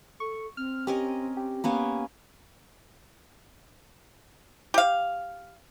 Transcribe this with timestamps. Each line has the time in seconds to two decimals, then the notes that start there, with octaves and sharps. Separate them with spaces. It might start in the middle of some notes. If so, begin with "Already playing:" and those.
0.20 A4 C#6
0.57 C4 F6
0.87 C#4 G4 A#4 D#5
1.37 G4
1.64 A#3 B3 C#4
4.74 G4 F5